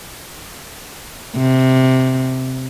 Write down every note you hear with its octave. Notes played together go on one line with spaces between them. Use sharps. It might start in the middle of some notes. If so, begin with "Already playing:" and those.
C3